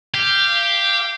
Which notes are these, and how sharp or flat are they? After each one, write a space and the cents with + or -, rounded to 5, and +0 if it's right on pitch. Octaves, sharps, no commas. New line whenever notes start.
G4 +0 F5 -20